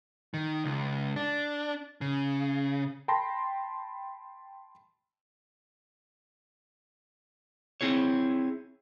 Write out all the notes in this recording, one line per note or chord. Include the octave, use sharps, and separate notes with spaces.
D#3
C#2
D4
C#3
G5 A5 B5 C6 A#6
C4 E4 G#4 C#5